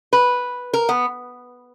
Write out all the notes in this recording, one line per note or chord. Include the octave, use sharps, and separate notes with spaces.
B4
A#4
B3